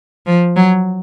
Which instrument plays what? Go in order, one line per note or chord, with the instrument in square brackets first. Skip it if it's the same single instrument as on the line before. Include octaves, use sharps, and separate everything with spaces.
[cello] F3
F#3